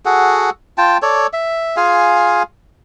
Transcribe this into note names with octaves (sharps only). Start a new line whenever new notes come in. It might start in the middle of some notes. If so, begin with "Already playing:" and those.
F#4 G#4 A4 F#5
F4 G5 A5
A4 C#5 D5
E5
F4 G#4 F5 G#5